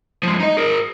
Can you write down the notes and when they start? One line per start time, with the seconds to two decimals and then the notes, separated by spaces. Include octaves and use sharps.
0.23 F3 G#3
0.40 D#4 D#5
0.57 G#4 A#4